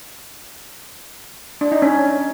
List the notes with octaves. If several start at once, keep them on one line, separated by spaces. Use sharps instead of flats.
D4
D#4
C#4